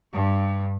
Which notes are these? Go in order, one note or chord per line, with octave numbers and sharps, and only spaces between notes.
G2